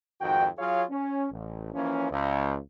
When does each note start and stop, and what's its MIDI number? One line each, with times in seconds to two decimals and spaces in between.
0.21 0.46 41
0.21 0.46 44
0.21 0.46 51
0.21 0.46 66
0.21 0.46 79
0.58 0.83 54
0.58 0.83 65
0.58 0.83 68
0.58 0.83 73
0.58 0.83 77
0.90 1.25 61
1.30 1.69 33
1.73 2.07 52
1.73 2.07 53
1.73 2.07 58
1.73 2.07 61
2.10 2.56 37